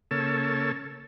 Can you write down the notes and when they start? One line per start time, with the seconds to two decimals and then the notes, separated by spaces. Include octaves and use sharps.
0.11 C#3 A#3 A4 C#5 A5 E6